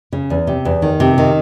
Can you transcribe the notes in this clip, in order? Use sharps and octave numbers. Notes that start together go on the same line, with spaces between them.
C#3
E2
C3
E2
D#3
C3
D#3